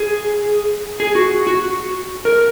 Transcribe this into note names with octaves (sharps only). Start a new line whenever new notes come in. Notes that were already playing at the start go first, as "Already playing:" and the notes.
Already playing: G#4
G#4
F#4
F#4
A#4